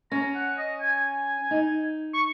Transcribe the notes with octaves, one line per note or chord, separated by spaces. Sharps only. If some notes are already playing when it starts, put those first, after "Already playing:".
C#4 A#5
F#5
D#5
G#5
D#4
C#6